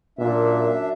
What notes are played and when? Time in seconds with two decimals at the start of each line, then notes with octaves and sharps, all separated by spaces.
0.19 F#2 A#2 D4 E5